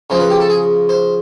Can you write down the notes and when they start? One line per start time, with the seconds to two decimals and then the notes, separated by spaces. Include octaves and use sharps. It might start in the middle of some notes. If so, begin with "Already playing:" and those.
0.10 C#3 F3 G#3 C5
0.20 B4
0.30 G4
0.40 A4
0.50 G#4
0.89 C5